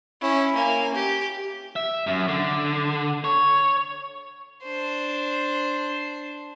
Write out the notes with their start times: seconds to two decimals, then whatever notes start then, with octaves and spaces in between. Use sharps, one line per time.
0.21 C#4 E4
0.55 A#3 G#5
0.94 G4
1.76 E5
2.07 F#2
2.29 D3
3.24 C#5
4.63 D4 C5